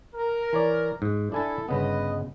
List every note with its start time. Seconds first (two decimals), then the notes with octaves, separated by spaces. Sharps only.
0.15 A#4
0.53 E3 C#5 D5
1.02 G#2
1.32 D4 E4 A4 G#5 A5
1.68 G1 C#3 B3 B4 D#5